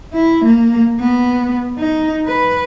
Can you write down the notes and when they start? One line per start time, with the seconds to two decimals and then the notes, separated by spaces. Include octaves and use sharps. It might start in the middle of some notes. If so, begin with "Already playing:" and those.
0.13 E4
0.45 A#3
1.00 B3
1.79 D#4
2.27 B4